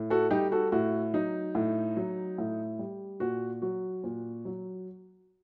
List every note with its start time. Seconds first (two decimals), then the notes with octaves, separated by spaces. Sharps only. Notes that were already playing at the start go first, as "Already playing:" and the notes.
Already playing: A2
0.10 F#4 A4
0.31 G3 D#4 G4
0.52 F#4 A4
0.72 A2 F#4
1.14 F#3 D#4
1.55 A2
1.97 F#3
2.38 A2
2.79 G3
3.20 A#2 F#4
3.62 F#3 F#4
4.04 A#2
4.45 F#3